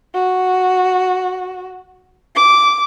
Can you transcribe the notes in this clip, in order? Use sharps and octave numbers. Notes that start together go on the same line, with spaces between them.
F#4
D6